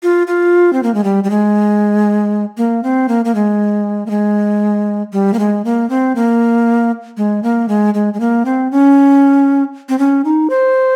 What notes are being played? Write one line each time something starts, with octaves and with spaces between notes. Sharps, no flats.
F4
F4
C4
A#3
G#3
G3
G3
G#3
A#3
C4
A#3
A#3
G#3
A#3
G#3
G3
A#3
G#3
A#3
C4
A#3
G#3
A#3
G#3
G#3
G#3
A#3
C4
C#4
C4
C#4
D#4
C5